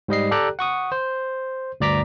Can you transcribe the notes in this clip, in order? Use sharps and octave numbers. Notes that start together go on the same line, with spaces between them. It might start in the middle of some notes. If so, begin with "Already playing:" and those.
G#2 G3 D#5 C7
G4 A4 D5 G5 A#5 F#6
F#5 C#6 D#6
C5
D2 G2 D5 A#5 D6 B6